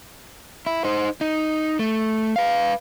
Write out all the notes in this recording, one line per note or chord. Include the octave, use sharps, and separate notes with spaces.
E4
D#4 C5
D#4
A3
B4 F5